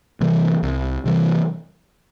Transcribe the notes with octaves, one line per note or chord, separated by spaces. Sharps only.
C3 E3 G3
C2
C3 E3 G3